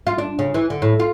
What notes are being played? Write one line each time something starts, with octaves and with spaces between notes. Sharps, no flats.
F4
D4
C#3
E3
D3
A2
F4